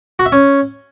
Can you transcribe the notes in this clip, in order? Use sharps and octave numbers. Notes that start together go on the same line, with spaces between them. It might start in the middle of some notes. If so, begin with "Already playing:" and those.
F#4
E5
C#4